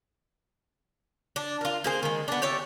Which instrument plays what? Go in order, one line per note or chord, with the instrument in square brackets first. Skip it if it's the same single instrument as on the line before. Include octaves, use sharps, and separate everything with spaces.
[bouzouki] D4
F4 A#4
A#3 G#4 C5
D#3 G#3
B3 D4
G4 C#5 D5 E5